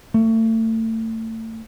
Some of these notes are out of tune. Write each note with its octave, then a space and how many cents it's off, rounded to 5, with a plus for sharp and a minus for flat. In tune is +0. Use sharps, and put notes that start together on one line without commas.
A3 +30